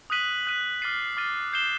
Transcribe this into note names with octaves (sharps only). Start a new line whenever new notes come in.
D#6 F#6 B6 D#7 F#7
D#6 F#6 B6 D#7 F#7
D6 F6 A6 C7 D#7
D6 F6 A6 C7 D#7
G6 C7 E7 G7